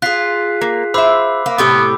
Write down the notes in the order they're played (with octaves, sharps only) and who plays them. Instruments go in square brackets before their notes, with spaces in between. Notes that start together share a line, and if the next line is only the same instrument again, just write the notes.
[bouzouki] F4 G#4 [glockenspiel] F#6 B6 C7
[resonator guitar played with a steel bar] A#3
[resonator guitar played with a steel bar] C5 E5 [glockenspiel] B5 D6 E6
[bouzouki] A#3
[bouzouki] A2 C3 G4 [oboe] B3 [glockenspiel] D6 E6